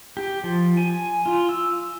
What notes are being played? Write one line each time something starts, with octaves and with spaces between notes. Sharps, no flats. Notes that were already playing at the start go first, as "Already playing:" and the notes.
G4
F3
G#5
F4
E6